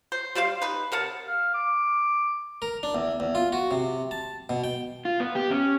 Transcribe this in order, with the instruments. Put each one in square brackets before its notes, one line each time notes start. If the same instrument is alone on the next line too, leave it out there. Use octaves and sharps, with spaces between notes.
[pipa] C5
G3 G4 C5 F5
D#4 B4
C3 A#4 F#5 A5
[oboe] F5
D6
[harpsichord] A#4
D4
E2
E2
F4
F#4
C3
A5
B2
G5
[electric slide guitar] F4
B3
G4
C#4